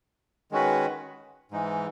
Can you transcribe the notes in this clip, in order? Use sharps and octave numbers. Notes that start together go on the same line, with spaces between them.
D#3 G#3 C#4 F#4 B4
G#2 E3 G#3 D#4